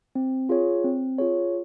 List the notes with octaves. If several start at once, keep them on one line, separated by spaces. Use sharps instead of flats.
C4
F4 G#4 C#5
C4
F4 G#4 C#5